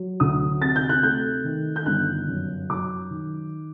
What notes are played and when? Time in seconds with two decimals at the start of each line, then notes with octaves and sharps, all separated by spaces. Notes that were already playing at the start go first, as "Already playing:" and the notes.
Already playing: F#3
0.20 D2 D#6
0.61 C3 A6
0.76 G6
0.89 F#6
1.03 A3 G6
1.44 D#3
1.76 G6
1.86 G1 F#6
2.28 F#2
2.70 F#3 D6
3.10 D#3